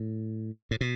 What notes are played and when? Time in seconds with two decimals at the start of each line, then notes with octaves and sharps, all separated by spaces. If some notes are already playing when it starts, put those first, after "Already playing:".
Already playing: A2
0.71 A2
0.81 B2